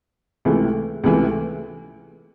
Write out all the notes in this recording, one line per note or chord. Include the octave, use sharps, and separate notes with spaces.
C#2 C3 E3 A3
C#2 C3 E3 A3